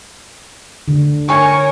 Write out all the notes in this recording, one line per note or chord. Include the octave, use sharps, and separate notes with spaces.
D3
A#4 C#5 G#5 C#6